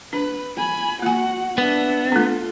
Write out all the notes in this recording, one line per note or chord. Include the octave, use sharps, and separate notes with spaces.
D4 B4
G#5 B5
A#3 F#4 F#5 G#5
B3 D4 E5
A3 D4 F4 A4